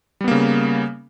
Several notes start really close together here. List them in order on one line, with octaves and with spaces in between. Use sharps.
G3 B3 A#3 C#3